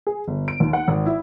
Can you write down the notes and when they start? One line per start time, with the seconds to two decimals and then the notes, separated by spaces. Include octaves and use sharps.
0.07 G#4
0.28 G1
0.48 D7
0.60 D#2
0.73 F#5
0.88 G#1
1.06 E4